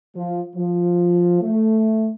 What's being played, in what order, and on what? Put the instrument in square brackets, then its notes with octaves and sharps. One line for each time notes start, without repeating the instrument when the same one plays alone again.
[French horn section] F3
F3
A3